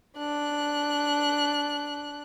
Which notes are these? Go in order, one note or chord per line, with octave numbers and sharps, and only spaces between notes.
D4 F#6